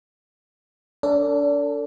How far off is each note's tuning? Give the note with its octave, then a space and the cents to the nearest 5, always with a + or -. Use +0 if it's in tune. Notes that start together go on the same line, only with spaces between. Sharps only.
D4 -30 A4 +35